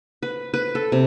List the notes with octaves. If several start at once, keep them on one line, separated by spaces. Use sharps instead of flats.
B4
B4
A4
C3